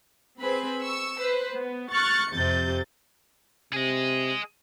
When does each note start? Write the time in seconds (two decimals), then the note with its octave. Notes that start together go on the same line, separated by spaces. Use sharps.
0.40 C4 G#4 B4 B5
0.82 C#6 E6
1.20 B4 C5
1.54 B3
1.93 C#6 F6 F#6 A6 C#7
2.34 F2 C3 G6 A6
3.73 C3 G#4 D#5